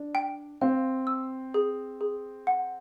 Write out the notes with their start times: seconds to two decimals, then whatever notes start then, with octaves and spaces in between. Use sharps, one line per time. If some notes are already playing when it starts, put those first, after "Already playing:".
Already playing: D4
0.15 G5
0.61 C4 F5
1.07 E6
1.54 G#4
2.01 G#4
2.47 F#5